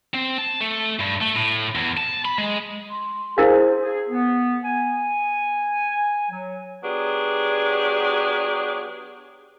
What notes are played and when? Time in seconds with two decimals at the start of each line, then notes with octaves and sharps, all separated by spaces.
0.15 C4
0.38 A5
0.61 A3
1.00 G2
1.22 A3
1.36 A2
1.76 E2
1.98 A5
2.25 B5
2.38 G#3
2.89 C6
3.38 E4 G#4 A#4 C5 F5
3.82 G#4
4.09 B3
4.65 G#5
6.31 F#3
6.84 F#3 B3 D4 G4 G#4